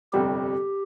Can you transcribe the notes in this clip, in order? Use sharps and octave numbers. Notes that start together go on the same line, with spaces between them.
G1 F2 C3 G3 C4 G4